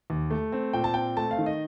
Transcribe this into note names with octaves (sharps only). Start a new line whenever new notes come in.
D#2
A3
C4
A#2 G5
A5
C4 G5
A3 A5
F5
D#3
D#5